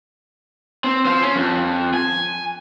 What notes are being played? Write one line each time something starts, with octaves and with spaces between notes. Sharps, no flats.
C4
C5 F5
C#4
F2
G#5